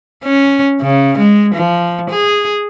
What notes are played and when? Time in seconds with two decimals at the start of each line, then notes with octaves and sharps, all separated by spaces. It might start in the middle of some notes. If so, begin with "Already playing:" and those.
0.24 C#4
0.81 C#3
1.18 G#3
1.55 F3
2.10 G#4